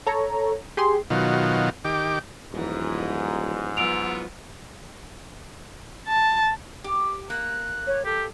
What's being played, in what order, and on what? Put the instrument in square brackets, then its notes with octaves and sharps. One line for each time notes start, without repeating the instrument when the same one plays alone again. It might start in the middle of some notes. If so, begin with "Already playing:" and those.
[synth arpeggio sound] A4 C#5 A#5
G4 G#4 C6
[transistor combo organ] B2 D#3 F#3 F4
D#3 G4 D6
[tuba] D#1 [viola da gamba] F2 E3 [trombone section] G#2
[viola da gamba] F#3 B3 F4 [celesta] E6 D7 F7
[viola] A5
[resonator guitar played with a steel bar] G4
[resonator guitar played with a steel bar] A#3 [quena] F#6
[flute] C#5
[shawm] G4 [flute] A4